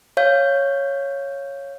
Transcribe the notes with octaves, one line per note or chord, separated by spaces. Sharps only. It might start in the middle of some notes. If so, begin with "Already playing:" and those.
C#5 F5 G6